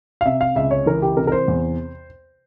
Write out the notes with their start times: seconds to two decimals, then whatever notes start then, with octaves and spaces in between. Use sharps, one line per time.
0.21 F5
0.25 C3 E5
0.41 F5
0.55 C#2 E5
0.71 C#5
0.86 E3 A#4
1.02 G4
1.17 C3 A#4
1.27 A#4
1.32 C5
1.48 E2